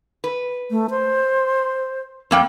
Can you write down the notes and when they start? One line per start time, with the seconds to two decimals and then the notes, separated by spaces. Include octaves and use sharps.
0.24 B4
0.71 A3
0.90 C5
2.31 F2 A#3 G5